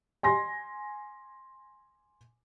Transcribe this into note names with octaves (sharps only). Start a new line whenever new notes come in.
G#5 C6 A#6